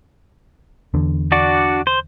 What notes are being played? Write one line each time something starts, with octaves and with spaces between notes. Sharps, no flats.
E2 D3
D4 F#4 D5
C5